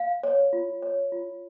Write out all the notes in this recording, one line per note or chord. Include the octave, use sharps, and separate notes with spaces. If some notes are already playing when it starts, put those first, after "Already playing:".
Already playing: F5
C#5
F4
C#5
F4